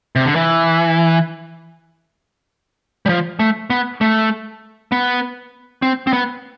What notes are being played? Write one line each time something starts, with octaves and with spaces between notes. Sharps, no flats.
C3
D3
E3
G3
F3
A3
B3
A3
B3
C4
C4
B3